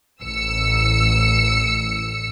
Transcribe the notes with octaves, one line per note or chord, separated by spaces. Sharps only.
A1 E6 C#7